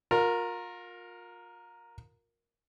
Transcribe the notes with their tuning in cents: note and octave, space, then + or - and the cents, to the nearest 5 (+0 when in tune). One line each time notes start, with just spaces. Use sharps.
F4 +35 A#4 +0